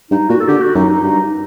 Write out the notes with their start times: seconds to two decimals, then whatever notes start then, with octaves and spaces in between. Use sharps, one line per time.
0.11 G2 D#4
0.29 A#2 F#4
0.40 A4
0.48 D3 G4
0.62 F#4
0.75 F#2 D#4
0.89 D#4
1.03 G2 D#4